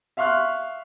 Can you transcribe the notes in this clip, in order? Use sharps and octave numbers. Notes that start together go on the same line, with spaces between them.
E5 F5 C6 C#6 F6 F#6